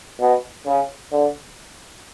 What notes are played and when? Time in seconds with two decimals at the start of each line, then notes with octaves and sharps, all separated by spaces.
0.20 B2
0.66 C#3
1.11 D3